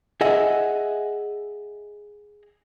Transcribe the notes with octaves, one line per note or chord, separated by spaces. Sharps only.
G#4 D#5 E5 F#5